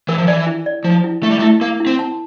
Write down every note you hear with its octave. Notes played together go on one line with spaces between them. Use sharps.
E3 A#4
F3
E3 D5
E4
D5
F3 E4
E4
A3 E4
G3
A3
E4
A#3 A#4
E4
C4
A5